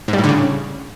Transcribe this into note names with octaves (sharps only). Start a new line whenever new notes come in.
G#2
G3
A2
D3
C#3